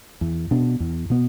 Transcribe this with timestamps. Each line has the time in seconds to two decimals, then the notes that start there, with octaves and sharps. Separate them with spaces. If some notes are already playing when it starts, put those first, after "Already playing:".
0.21 E2
0.51 B2 B3 D4
0.80 E2
1.10 B2 B3